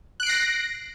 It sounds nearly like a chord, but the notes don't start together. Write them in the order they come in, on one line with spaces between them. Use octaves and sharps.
F#6 D7 C7 A#6